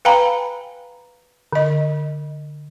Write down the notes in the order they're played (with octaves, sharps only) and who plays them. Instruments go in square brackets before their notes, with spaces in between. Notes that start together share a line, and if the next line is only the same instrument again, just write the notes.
[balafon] B4 F5 G5 G#5 A#5 B5
D3 D#5